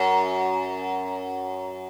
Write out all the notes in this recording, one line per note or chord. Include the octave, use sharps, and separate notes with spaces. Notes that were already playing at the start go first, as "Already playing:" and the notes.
Already playing: F#2